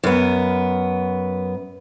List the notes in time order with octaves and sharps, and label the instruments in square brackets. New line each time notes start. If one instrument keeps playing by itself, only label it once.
[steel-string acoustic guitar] F#2 B3